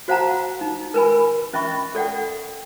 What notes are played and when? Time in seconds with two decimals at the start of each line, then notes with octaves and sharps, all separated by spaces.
0.08 F#4 C5 F5 F#5 A5 A#5
0.61 D#4
0.94 A#4 B4 G#5 B5
1.53 C#4 D#5 E5 B5 C#6
1.95 A4 D5 F#5 G5